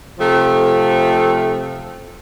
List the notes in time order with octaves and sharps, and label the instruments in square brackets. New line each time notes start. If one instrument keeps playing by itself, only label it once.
[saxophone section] C3 F3 A3